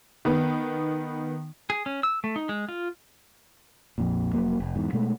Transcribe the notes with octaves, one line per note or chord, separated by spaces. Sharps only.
D#3 B3
G#4
C#4
E6
A3
D#4
G#3
F4
A#1 F2 A#2
F1 F#2 F#3 A#3
F1
E2 G#2
B2 G#3 A3